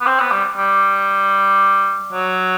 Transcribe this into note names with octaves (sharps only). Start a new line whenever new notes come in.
B3
C4
B3
G3
G3
F#3